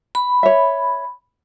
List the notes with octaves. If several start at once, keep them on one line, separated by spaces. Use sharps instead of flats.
B5
C#5 E5